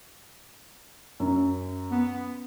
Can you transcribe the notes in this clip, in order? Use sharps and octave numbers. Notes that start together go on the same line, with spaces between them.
F#2
B3